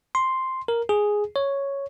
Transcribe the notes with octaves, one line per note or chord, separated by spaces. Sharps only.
C6
A#4
G#4
C#5